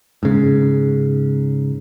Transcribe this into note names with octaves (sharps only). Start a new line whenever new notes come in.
G#2 C#3